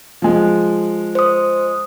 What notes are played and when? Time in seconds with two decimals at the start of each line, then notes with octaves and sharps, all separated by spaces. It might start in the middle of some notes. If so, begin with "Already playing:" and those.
0.22 F3 G#3
1.15 C5 D#6